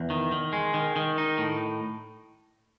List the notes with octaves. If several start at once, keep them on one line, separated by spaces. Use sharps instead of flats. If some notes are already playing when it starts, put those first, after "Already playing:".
Already playing: E2
D#3
D#3
G#3
D#3
D#3
D#4
A2